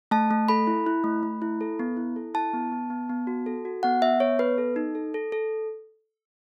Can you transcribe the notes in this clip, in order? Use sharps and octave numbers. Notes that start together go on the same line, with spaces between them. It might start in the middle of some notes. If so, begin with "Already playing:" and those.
A3 A5
A3
A4 B5
E4
E4
A3
A3
E4
A4
B3
E4
A4
E4 A5
B3
B3
B3
B3
F#4
A4
F#4
B3 F#5
B3 E5
B3 C#5
B3 B4
A4
D#4
A4
A4
A4